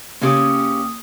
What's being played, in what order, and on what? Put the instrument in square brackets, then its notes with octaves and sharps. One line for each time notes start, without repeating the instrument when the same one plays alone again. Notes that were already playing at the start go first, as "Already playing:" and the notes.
[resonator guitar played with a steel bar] C#3 C#4 G4 [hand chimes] A#3 D#6